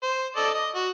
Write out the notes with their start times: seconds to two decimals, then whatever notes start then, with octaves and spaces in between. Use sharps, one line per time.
0.03 C5
0.37 A4 D5 D#5
0.54 D#5
0.75 F#4